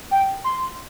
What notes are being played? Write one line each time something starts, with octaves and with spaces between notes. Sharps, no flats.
G5
C6